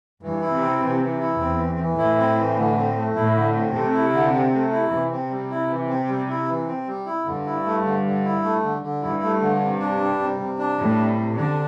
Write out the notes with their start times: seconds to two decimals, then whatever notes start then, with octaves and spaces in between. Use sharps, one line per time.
0.21 G2 E3
0.41 E4
0.52 C3
0.61 C4
0.81 C3 E3
1.01 E3
1.20 E4
1.39 E2 C4
1.59 E3
1.78 E3
1.98 A2 E4
2.18 C4
2.38 E3
2.56 D3
2.76 C4
2.96 A3
3.15 A2 E4
3.35 D3
3.55 C4
3.73 C3 A3
3.94 E4
4.13 D3
4.33 C4
4.52 A3
4.72 E4
4.92 C3 E3
5.11 C4
5.30 G3
5.50 E4
5.70 E3
5.89 C4
6.08 G3
6.29 E4
6.48 E3
6.67 C4
6.87 G3
7.06 E4
7.26 G2 D3
7.46 E4
7.65 A3
7.85 D3
8.05 D3
8.24 E4
8.43 A3
8.63 D3
8.82 D3
9.02 G2 E4
9.22 A3
9.41 D3
9.61 C3
9.80 D4
9.99 G3
10.19 C3
10.39 C3
10.59 D4
10.78 A2 G3
10.98 C3
11.17 C3
11.36 D3 D4